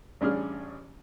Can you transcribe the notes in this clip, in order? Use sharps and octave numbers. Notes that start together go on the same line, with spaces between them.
A1 G3 C#4 D4 G#4 F6